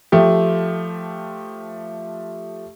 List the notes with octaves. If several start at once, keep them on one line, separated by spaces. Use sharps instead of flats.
F3 A3 G4